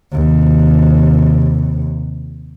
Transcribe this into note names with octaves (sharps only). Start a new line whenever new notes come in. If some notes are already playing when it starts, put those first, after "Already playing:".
D#2 C3